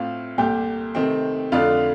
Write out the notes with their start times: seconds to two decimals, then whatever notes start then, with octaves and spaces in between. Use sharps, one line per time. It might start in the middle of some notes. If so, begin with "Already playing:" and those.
Already playing: A2 A3 C4 F4 F5
0.38 C2 A#2 A3 G4 G5
0.95 C3 D#3 A3 C4
1.52 F2 D3 A3 D4 F4 F5